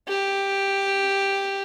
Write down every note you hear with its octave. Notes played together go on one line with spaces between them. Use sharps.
G4